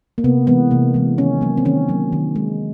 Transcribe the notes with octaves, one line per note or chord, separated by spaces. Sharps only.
A#3
C3 B3
E3 G#3 B3
C3 A#3
E3 G#3
D#3 C#4
F#3 A#3
C4
D#3 C#4
F#3 A#3
D#3
G#3